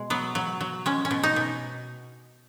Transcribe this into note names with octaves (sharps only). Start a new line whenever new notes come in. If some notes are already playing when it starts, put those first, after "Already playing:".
Already playing: B2 G#3
F#3 B3
F#3
F#3
G#3 C#4
C#4
B2
D#4
B2